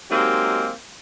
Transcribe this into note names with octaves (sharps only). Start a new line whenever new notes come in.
F#3 G#3 A#3 C4 D#4 G4